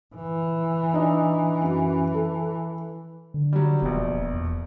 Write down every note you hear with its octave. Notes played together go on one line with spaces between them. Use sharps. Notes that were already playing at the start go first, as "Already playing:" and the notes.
E3
D4 D#4 D#5
F#2 F#4
A4
D3
F#3 G3
E1 A#1 B2
E2